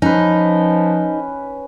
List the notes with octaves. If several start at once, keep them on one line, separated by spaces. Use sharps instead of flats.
F3 C#4 D#4 B4